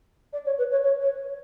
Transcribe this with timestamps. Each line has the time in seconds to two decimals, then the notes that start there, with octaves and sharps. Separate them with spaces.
0.32 D5
0.45 C#5
0.58 B4
0.71 C#5
0.83 C#5
1.01 C#5